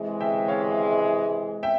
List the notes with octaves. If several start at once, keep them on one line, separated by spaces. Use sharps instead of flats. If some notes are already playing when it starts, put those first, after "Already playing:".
Already playing: C3 E3 G#3
E5 G5
C#5 F5
E5 G5